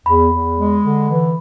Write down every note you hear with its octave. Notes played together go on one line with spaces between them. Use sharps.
E2 B5
E2
G#3
D3
E3